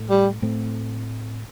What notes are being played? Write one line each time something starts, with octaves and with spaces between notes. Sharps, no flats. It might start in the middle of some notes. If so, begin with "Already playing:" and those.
Already playing: A2 A3
G3
A2 A3 C4